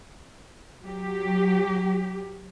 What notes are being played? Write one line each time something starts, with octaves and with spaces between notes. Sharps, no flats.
F#3 G4